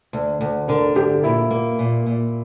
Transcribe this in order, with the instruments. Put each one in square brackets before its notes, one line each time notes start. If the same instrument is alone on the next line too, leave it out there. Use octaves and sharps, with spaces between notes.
[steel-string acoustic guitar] D2
D2
[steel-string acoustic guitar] D3 [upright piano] A#4
[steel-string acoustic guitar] D2 [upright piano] G4
[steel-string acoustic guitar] A#2 [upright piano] E4
[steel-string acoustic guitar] A#3
A#2
A#2